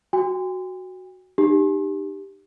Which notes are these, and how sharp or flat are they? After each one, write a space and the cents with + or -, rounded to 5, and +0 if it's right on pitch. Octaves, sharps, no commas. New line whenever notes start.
F#4 +0 G5 +45
D#4 -35 G4 +0